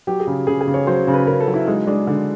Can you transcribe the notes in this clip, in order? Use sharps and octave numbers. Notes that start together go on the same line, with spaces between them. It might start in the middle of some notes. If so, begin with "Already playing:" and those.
F#3 G4
G#4
C#3
C#3 G#4
G#4
C#3
C#5
F#3 C5
C#3
B4
C#3 A#4
A4
F#3
E4
G#3 D#4
G#3 D4
D3